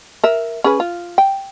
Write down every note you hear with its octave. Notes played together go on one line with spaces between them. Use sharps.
A#4 E5
C#4 G#4 B4
F4
G5